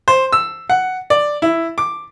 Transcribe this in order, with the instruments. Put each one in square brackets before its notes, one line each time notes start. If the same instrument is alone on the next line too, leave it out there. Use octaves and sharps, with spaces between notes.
[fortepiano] C5
E6
F#5
D5
E4
D6